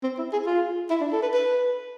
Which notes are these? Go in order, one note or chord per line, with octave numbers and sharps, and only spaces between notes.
C4
E4
G#4
F4
E4
D4
A4
B4
B4